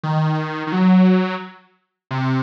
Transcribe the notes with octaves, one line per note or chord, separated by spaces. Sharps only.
D#3
D#3
F#3
C3